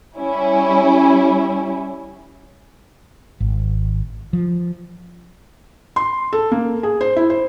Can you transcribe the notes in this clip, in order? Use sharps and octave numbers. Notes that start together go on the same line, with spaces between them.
G3 C#4 E4
G#1
F3
C6
A4
A#3
G#4
C5
E4
C5